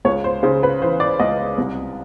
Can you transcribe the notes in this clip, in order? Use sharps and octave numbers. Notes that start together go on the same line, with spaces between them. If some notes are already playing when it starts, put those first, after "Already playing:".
C#2 C#5
C5
C#3 C5
B4
E3 C5
D5
C#2 D#5
C2